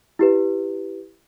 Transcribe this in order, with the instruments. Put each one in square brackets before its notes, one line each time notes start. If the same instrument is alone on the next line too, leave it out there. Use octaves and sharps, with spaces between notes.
[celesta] E4 G4 B4